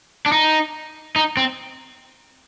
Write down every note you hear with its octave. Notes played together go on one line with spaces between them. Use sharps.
D4
D#4
D#4
C4